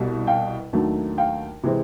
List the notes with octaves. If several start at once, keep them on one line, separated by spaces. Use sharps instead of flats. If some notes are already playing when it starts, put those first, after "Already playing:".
Already playing: C2 B2 G3
F5 G5
D#2 D#3 F#3 A3 D4
F5 G5
C3 E3 G#3 C4